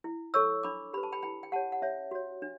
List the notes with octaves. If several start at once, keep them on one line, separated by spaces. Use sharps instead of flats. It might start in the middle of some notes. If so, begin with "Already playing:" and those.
E4
A4 C#5 C#6 E6
D4 B5 D6
G4 B4 B5
A5
G5 B5
E4 G5 B5
G5
G4 C#5 F#5 A5
F#5
C#4 C#5 E5
F#4 C#5
D4